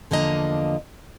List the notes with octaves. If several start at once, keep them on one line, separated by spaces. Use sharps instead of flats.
E2 D3 F3 A#3 D#5 A#5